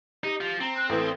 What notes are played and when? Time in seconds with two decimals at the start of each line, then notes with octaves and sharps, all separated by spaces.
0.24 D#4 G4
0.41 F3
0.60 C4 A#5
0.77 F#6
0.89 A1 E3 A4